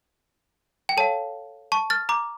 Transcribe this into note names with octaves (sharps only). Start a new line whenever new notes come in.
G5
A4 C#5 F5 A5
A5 C#6
F6 A6
A#5 D6